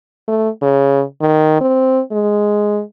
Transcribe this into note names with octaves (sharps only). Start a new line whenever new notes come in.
A3
C#3
D#3
C4
G#3